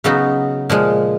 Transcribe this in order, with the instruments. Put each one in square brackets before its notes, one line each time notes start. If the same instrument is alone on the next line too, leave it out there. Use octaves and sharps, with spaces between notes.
[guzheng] C#3 F#3 B3 D#4 F#4
A#2 F3 G#3